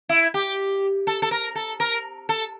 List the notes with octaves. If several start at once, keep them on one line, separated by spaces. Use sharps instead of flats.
E4
G4
A4
A4
A#4
A4
A#4
A4